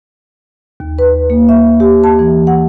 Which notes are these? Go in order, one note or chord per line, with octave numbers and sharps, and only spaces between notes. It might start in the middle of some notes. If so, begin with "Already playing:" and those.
D#2
B4
A#3
E5
G4
A5
E3
F#5